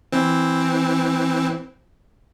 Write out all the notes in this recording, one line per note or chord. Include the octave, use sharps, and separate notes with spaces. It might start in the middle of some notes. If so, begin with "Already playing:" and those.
E3 C4